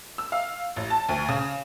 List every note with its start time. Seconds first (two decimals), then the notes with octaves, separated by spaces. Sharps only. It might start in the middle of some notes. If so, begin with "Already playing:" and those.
0.18 E6
0.32 F5
0.76 A1
0.90 A5
1.09 D2
1.29 C#3